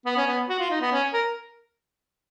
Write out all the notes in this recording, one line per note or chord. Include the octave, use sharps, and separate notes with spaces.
B3
C#4
B3
F#4
F4
D#4
B3
C#4
A#4